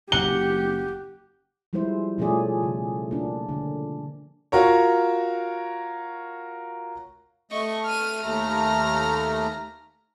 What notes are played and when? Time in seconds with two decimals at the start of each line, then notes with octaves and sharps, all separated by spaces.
0.12 F#1 G4 F#5 G7
1.73 F3 G3 G#3 E4 C5
2.18 B2 F3 A3 C#4 G#4 D5
2.63 C#3
3.11 A#3 D4
3.49 D3
4.52 F4 F#4 A#4 C#5
7.51 A3 D#5 C#6
7.85 F6 D#7
8.22 D#2 A3 A#5 F6